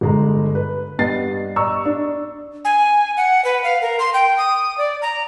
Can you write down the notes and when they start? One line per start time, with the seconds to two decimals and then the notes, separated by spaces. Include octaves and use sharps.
0.01 G1 G#3 A#5
0.55 B4
0.99 G2 G3 B3 D#5 A6 C7
1.56 D5 D#5 A#5 C#6 D#6 E6
1.85 D4
2.65 G#5
3.17 F#5
3.45 B4
3.64 F5
3.82 A#4
3.99 C6
4.14 G5
4.38 D#6
4.78 D5
5.02 A#5